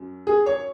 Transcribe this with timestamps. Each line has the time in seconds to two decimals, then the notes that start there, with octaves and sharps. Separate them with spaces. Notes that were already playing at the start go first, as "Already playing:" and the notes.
Already playing: F#2 F#3
0.27 G#4
0.46 C#5